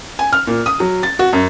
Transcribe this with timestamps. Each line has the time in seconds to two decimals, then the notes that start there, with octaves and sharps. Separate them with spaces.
0.19 G#5
0.33 F6
0.47 A#2
0.66 D#6
0.80 F#3
1.03 A6
1.19 F#4
1.33 F#2